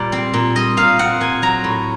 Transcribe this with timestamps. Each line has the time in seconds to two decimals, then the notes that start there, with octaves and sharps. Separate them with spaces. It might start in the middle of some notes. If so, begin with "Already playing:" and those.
Already playing: A#2 G3 D5
0.12 C4
0.34 A#2
0.55 G3 D#5
0.77 A#2 F5
0.99 C4 F#5
1.20 A#2 G#5
1.42 F#3 A#5
1.64 A2